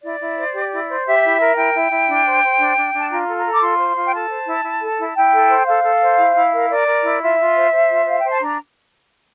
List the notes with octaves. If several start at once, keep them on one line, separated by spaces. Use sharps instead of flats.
E4 D5
E4
C5
G4
E4
C5
G4 E5
E4
A#4
E4 G5
E4
E4
D4
C5
C5
D4
D4
D4
A5
F4 A#5
A4
A#5
A4
D6
F4 C6
C5
F4
G5
A4 A5
C5
E4
E4
A4
E4
E4 G5
A4
C5
A4 F5
A4
C5
E4
E4
A#4
A#4 D5
A#4
E4
F4 E5
F4
C5
C5
F4
C5 F5
C5 G5
A5
D4 A#5